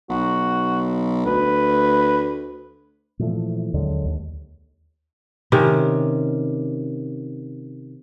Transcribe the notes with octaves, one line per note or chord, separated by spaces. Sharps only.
B1 F#4
D2 B4
A#2 E3 F3 A3
D#2 D3 F#3 G#3
D#2
C3 D#3 C#4